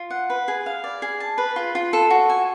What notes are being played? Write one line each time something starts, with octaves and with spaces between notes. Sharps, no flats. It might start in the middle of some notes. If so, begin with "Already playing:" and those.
Already playing: F4
F#5
B4
G#4
F5
D5
G#4
A5
B4
F4
F4
A4
F#4
G#5